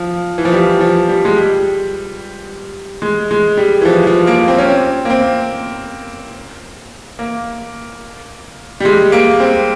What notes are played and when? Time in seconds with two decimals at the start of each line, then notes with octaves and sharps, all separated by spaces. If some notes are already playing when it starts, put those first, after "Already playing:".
Already playing: F3
0.38 E3
0.45 F3
0.53 G3
0.81 F3
1.09 G3
1.25 G#3
1.36 G3
3.02 G#3
3.31 G#3
3.57 G3
3.82 E3
3.85 F3
4.07 F3
4.27 A#3
4.48 C4
4.58 C#4
4.69 C4
5.05 A#3
5.10 C4
7.19 A#3
8.80 G3
8.85 G#3
9.12 A#3
9.40 C4